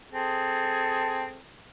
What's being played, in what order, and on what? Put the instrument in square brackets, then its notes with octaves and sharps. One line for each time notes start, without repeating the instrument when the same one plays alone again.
[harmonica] C4 G#4 A4